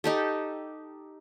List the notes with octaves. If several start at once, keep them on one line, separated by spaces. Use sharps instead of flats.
D#4 G4 A4